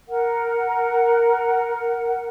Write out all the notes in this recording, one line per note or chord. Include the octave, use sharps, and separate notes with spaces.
A#4 F#5